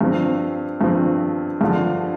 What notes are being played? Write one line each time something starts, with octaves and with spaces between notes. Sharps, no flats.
G2 F3 C4
G2 F3 C4
G2 D3 F3